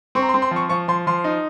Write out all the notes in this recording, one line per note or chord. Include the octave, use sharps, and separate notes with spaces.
C4 C#6
A#5
C6
C4
C6
F3 C#6
F3 C#6
F3 C6
F3 C6
D#4